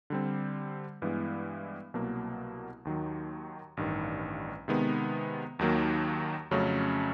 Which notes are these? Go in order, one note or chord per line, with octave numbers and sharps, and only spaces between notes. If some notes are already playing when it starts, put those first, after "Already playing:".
D3 G3 C4
G2 E3 G#3 B3
C2 B2 F#3 A#3
D#2 D#3 F#3
A1 G2 D#3
C3 D#3 G#3 B3
D#2 D#3 F#3 A#3
F2 C#3 F#3 A3 C#4